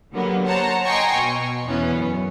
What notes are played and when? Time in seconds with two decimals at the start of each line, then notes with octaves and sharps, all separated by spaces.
0.13 D3 F#3 G3 A#3 B3
0.45 C5 C#5 F#5 A5 A#5
0.84 D#5 G5 G#5 A#5 C6 C#6
1.16 B2
1.65 E2 E3 B3 C#4
1.96 F#2